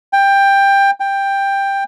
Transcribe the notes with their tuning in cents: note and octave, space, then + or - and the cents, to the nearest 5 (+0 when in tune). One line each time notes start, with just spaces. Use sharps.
G5 +15
G5 +10